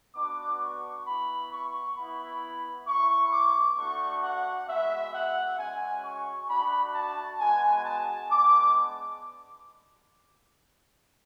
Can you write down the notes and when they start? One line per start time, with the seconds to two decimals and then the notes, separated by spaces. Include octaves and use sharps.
0.16 B3 D4 F#4 D6
0.60 C#6
1.06 B3 E4 B5
1.52 C#6
1.97 B3 E4 B5
2.87 B3 E4 C#6
3.33 D6
3.78 A3 D4 F#4 C#6
4.24 F#5
4.68 G#3 B3 F#4 E5
5.14 F#5
5.59 G#3 C#4 F#4 G#5
6.05 C#6
6.49 A3 D4 F#4 B5
6.95 A5
7.40 G#3 B3 F#4 G#5
7.86 A5
8.31 G#3 B3 D4 D6